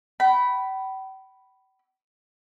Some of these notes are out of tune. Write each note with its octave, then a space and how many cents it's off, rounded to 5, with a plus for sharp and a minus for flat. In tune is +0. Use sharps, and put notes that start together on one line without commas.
G5 -40 B5 +0